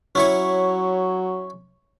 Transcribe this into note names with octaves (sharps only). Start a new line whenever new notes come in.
F#3 C#4 E4 C#5